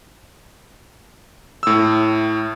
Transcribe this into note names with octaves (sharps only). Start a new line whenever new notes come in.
A2 E6